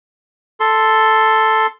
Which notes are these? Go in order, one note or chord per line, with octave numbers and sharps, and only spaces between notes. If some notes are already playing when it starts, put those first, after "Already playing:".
A4 C6